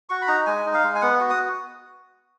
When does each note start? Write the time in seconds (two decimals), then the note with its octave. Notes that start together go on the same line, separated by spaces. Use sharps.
0.09 F#4 C#6
0.22 B5
0.28 D#4 A#5
0.46 G#3 G#5
0.66 D#4
0.74 F5
0.84 G#3
0.95 G#5
1.02 B3 F#5
1.20 F#4
1.30 D#6